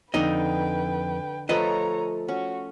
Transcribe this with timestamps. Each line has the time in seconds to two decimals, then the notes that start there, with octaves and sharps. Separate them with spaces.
0.14 F2 D3 D4 D#4 B4 D#5 G5
1.49 F3 A3 A4 B4 C#5 D#5 A#5
2.28 C#4 F#4